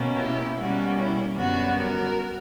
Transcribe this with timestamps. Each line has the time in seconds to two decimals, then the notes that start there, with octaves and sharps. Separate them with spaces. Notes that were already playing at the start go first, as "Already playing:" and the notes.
Already playing: B2 A#3 C#4
0.17 E4 G4
0.56 B2 G3 A#3 C#4 F#4
0.96 E4
1.35 F#2 D3 G3 B3 F#4
1.76 F#4 A#4